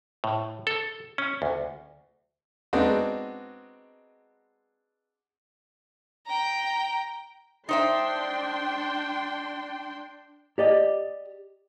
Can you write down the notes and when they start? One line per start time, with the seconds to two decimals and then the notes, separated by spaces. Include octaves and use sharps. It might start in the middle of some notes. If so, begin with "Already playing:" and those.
0.24 A2
0.67 A4
1.18 C#4
1.42 D2
2.73 G#3 B3 C4 D4 D#4 F#4
6.26 G5 A#5
7.69 D4 D#4 C5 E5 G5 C6
10.58 G4 D5 D#5